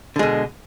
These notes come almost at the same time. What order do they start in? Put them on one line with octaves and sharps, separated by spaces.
D3 G#3 B2